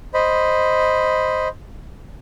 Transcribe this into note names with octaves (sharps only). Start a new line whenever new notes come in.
C5 D#5 B5